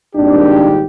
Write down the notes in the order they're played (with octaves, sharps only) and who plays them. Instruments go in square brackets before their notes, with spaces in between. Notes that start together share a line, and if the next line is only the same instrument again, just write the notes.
[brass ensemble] G#1 G4 [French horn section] A#2 G3 D#4 [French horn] D4